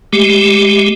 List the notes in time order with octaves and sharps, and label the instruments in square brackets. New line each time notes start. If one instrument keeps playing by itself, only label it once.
[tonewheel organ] G#3 A3 G4